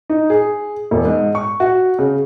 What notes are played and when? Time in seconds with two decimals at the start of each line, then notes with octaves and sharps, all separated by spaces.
0.10 D#4
0.30 G#4
0.91 E1
1.05 G#2
1.35 C#6
1.60 F#4
1.99 C#3